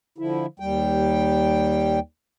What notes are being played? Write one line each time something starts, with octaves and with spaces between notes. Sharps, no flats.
D3 F3 E4
D#2 G3 G5